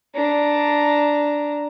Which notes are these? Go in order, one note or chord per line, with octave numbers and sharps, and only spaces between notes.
D4 A#5